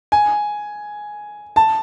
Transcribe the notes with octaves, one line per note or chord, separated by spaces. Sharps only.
G#5
A5